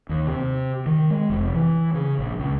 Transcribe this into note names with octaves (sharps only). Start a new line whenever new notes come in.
D#2
C3
D#3
G#3
F1
E3
C#3
A#1
C#2